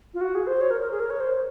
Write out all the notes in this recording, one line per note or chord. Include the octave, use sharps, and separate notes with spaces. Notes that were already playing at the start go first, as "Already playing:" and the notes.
F4
F#4
G#4
C5
C#5
A#4
A#4
G#4
A#4
C#5
C5